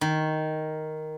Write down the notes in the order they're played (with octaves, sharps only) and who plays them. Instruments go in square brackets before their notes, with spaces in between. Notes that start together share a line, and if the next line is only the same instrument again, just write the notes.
[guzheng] D#3